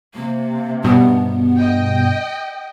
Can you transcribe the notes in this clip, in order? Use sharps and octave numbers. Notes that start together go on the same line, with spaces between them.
C3 A#3
G2 B2 B3
D#5 G5